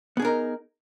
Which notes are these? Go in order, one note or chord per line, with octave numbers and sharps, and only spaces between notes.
B3 D4 D#4 G#4 A#4